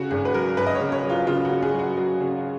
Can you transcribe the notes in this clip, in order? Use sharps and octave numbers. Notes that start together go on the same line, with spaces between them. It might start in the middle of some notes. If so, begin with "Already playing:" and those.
Already playing: C#3 F#4
G#1 G#4
B4
F#3 A#4
G#1 B4
D#5
C#5
C#3
C#5
F#3
F4
C#3 F4
F#4
C#3
G#4
F#3 F#4
F#3 F#4
C#3